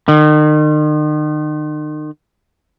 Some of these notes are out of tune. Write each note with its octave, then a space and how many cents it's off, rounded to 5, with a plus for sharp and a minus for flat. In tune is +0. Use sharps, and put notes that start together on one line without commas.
D#3 -40